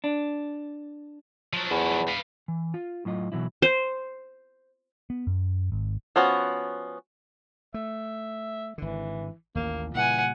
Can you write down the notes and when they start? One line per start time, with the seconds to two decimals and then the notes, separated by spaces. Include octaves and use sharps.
0.04 D4
1.53 F3 F#3
1.70 E2
2.08 B4 F5
2.48 E3
2.74 F4
3.05 A2 F#3 F4 D#5
3.32 B2 E3 F#3 E4
3.62 C5
5.10 B3
5.27 F#2
5.72 G#1
6.16 F3 B3 C#4 F#4
7.74 A3 E5
8.78 G#1 D3 E3
9.55 A1 D#2 A#3
9.95 A#2 C#3 E3 G3 F#5 G#5